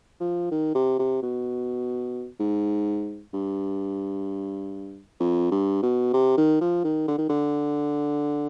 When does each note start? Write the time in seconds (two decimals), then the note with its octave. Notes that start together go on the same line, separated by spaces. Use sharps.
0.20 F3
0.51 D#3
0.74 C3
0.99 C3
1.22 B2
2.39 G#2
3.33 G2
5.20 F2
5.51 G2
5.83 B2
6.13 C3
6.37 D#3
6.61 F3
6.84 D#3
7.08 D3
7.18 D#3
7.29 D3